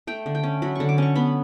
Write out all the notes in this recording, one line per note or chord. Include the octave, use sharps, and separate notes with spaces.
A3 G5
D3
G5
C#4
F#3 B5
D3 C#6
D6
C#4 C#6
B3 B5